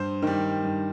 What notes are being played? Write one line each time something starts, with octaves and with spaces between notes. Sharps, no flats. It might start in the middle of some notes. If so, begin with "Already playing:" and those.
Already playing: G2 C5
D#3 G3
G2